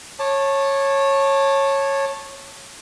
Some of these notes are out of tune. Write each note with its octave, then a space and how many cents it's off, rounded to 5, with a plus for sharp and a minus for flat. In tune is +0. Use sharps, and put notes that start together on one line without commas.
C#5 -15 A5 +0 D6 +15